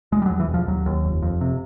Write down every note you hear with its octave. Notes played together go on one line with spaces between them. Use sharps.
E1 G#3
G3
F#3
E2
E3
E1 F3
D#2 F#3
D#2
F1
F2
C3